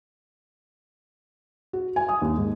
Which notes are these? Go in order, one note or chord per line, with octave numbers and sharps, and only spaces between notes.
F#4
G#5
D#6
D#2
G#2